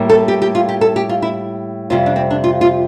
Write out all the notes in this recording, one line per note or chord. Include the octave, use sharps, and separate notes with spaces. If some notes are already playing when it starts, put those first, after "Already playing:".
Already playing: A2 G3 A#3
A4
G4
G4
F4
G4
A4
G4
F4
E4
F2 C3 G3 F4
D4
C4
D4
F4
F4